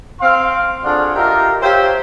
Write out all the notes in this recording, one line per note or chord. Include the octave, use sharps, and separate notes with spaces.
C4 F5 C6
D4 F4 F#4 G#4 A4 D5
F4 G4 A4 A#4 D#5 E5
G4 C5 C#5 E5 F5 G5